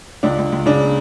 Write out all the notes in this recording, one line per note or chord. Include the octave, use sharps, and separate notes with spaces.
C#2 D4
C#2
C#2
C#3 D4